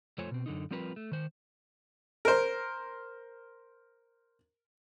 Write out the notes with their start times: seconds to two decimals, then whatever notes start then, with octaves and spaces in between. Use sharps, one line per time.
0.18 F2 A3 F4 C5 C#5 G#5
0.31 B2 C4
0.46 F#2 D3 D#4
0.71 F3 G3 C4 F4 A#4 B4
0.96 A3
1.12 D#3 C5
2.25 A#4 C5